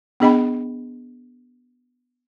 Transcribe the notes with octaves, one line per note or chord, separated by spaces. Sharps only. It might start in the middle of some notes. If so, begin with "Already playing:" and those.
B3 D4 G#4 D#5 G5 B5